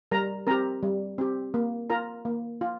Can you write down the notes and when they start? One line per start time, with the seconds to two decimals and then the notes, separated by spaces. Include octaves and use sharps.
0.11 G3 A#4 A#5
0.47 C4 G4 A#4 A#5
0.83 G3
1.18 C4 G4
1.54 A#3
1.90 F4 A#4 A#5
2.25 A#3
2.61 F4